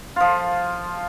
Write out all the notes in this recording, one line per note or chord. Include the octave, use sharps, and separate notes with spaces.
F3 F4